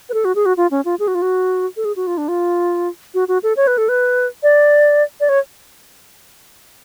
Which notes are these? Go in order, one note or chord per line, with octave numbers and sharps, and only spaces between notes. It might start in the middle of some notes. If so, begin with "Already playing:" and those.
B4
A4
F#4
G#4
F#4
F4
C#4
F4
G#4
F#4
F4
F#4
A4
G#4
F#4
F4
D4
F4
F#4
F#4
A4
C#5
B4
A4
B4
D5
D5
C#5